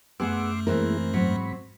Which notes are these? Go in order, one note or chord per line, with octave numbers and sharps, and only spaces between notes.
F#2 A3 B3 G#4 F#5 C6 D6 E6
E3 G#3 A#3 C4 E4 A#4
G#2 F#3 C4 B5 C#6